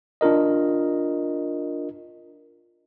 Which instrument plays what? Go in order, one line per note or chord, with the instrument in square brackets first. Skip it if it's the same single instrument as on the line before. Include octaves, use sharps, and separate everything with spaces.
[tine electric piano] D4 F4 A#4 D#5